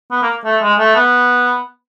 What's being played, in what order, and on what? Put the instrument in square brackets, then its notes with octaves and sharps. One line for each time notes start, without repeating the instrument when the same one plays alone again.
[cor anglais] B3
A#3
A3
G#3
A3
B3